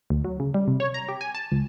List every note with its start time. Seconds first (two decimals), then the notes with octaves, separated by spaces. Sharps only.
0.10 D2
0.25 F#3
0.40 C#3
0.54 G3
0.68 C3
0.80 C#5
0.94 A#5
1.09 G4
1.21 G#5
1.35 A5
1.52 C#2